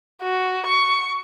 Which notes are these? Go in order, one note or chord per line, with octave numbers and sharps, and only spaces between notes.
F#4
C#6